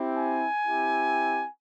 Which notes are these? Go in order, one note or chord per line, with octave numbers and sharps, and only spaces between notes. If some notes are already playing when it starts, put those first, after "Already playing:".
Already playing: C4 E4 G4
G#5
C4 E4 G4